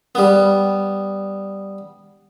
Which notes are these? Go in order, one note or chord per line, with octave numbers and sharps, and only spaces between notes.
G3 B3